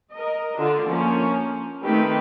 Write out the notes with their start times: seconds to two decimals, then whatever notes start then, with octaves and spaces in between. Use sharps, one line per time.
0.11 A#4 D#5
0.56 D3 D4 F4
0.88 F3 A#3 C#4
1.82 D#3 A3 C4 D#4 G4 B4